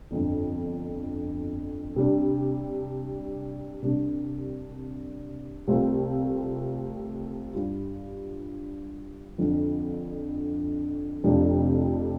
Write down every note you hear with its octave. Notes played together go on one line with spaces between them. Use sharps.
G1 F2 D3
C3 G3 D4
C2 C3 G3 D4
C2 C3 A3 C4 F4
G2 G3 F4
F2 D3 F3
F1 F2 C3 F3 D4